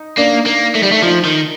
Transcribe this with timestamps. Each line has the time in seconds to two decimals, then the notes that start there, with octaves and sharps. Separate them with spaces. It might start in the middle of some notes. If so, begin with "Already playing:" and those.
Already playing: D#4
0.18 A#3 D4
0.46 A#3
0.75 A3
0.83 G3
0.91 A3
1.03 F3 D#4
1.25 D#3